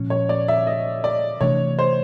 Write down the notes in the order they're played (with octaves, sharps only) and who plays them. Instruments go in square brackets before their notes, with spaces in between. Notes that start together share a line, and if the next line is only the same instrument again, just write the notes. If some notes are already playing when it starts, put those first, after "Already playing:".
Already playing: [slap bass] A#2 F3 G#3 C#4
[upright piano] C#5
D5
E5
D#5
D5
[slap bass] C3 E3 A3 D4 [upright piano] C#5
[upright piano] C5